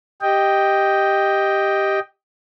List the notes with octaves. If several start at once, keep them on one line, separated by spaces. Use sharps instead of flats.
G4 D#5 G5